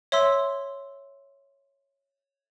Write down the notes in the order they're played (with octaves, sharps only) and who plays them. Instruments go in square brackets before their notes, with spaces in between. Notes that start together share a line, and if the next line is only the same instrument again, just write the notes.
[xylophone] C#5 E5 C6 E6